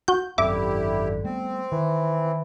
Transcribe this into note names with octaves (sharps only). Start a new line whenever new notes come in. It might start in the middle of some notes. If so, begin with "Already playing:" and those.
F#4 G6
G#1 F#2 D3 C4 E4 G4 E5 D6
G3 A3 B3 C4
D#3 E3